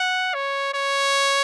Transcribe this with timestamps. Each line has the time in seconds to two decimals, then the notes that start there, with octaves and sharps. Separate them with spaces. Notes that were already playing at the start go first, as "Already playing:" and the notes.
Already playing: F#5
0.34 C#5
0.74 C#5